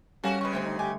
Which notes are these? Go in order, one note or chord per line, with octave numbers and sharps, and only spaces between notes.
G3 C#4 F#4 A4 A#4 F5 G#5
C#3 G#3 B4 C#6
D2 C4 C5 G5
D#4
G4 G#5